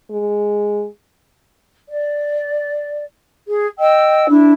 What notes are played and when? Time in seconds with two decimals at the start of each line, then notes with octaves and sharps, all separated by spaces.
0.10 G#3
1.88 D5
3.47 G#4
3.78 D#5 G5 E6
4.28 D4 E4